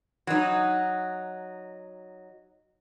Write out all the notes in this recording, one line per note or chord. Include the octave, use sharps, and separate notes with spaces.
F#3 D#4